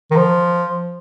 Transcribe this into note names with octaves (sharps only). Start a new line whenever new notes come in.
D#3
F3